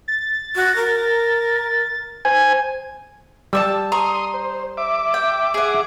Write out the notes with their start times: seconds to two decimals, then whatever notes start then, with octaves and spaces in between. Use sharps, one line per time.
0.08 A6
0.56 F#4
0.76 A#4
2.25 C5 G#5
3.53 G3 A5 C#6 E6
3.92 A#5 C6 C#6 D#6
4.34 C5
4.77 E5 D6
5.14 G5
5.54 G#4 F#5